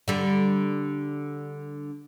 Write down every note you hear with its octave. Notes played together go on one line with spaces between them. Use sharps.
D3 G3